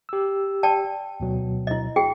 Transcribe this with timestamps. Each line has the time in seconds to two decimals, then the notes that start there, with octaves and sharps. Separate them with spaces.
0.09 G4 E6
0.63 D5 G5 A5
1.20 D2 B2 F#3
1.67 E4 D#5
1.96 F#4 G#4 G5